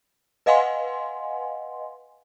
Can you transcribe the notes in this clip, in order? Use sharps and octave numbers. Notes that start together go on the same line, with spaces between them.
B4 D#5 F5 F#5 G#5 C6